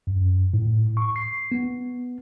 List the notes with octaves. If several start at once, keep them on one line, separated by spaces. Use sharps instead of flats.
F#2
A2
C#6
C7
B3